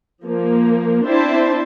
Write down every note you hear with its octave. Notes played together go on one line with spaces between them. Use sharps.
F3 A#3
C4 D4 E4 C5 E5 A5